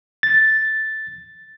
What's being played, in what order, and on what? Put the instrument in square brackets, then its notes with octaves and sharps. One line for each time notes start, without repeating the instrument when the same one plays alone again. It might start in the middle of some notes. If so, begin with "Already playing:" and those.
[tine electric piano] A6